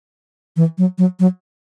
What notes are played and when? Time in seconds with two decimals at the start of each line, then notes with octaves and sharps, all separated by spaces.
0.57 E3
0.78 F#3
0.98 F#3
1.20 F#3